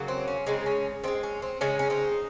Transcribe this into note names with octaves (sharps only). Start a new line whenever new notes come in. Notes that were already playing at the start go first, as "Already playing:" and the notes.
Already playing: C#3 F#3 A#3
C4
C#4
C#3 G#3 C4 D#4
C#4
D#3 G#3 C4
C#4
C4
C#3 G#3 C#4
C#4
C4 D#4